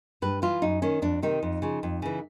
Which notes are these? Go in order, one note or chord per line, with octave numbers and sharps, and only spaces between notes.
G2 B4
E3 F4
F#2 D#4
D#3 C#4
F2 D4
C3 D#3 D#4
F2
C#3 F3
F2
C#3 E3